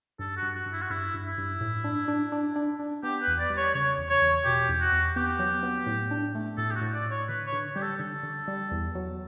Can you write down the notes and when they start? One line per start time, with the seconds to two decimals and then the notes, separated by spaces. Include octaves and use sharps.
0.19 G2 A4
0.37 F#4
0.43 G2
0.55 F#4
0.66 G2
0.73 E4
0.82 F#4
0.90 G2 E4
1.14 G2
1.26 E4
1.38 G2
1.61 A2
1.84 D4
2.08 D4
2.32 D4
2.56 D4
2.80 D4
3.03 B3 G4
3.22 B4
3.27 E2
3.39 D5
3.50 G3
3.57 C#5
3.74 C#3 C#5
3.98 E2
4.09 C#5
4.22 E2
4.45 B2 G4
4.69 E2
4.81 F#4
4.92 E2
5.16 B3 G4
5.39 F#3
5.63 B3
5.87 A2
6.11 D4
6.35 A3
6.58 A2 A4
6.71 G4
6.76 F#4
6.81 A2
6.94 D5
7.06 A2 C#5
7.28 D3 B4
7.47 C#5
7.53 D3
7.76 G3 G4
7.82 A4
8.00 D3 A4
8.23 D3
8.48 G3
8.72 E2
8.95 F#3